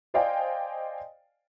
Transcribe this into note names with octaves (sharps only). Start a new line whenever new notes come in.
C5 D5 D#5 F5 G5 G#5